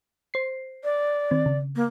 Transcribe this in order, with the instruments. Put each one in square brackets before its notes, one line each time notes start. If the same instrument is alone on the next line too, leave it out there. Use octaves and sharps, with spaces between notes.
[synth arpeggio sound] C5 C7
[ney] D5
[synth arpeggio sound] D#3 C4
C#3
[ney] A#3